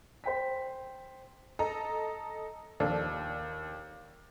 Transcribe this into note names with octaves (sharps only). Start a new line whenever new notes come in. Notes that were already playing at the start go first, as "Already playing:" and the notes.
C5 G5 B6
A4 D#5 A#5
D#2 F3 D4 A4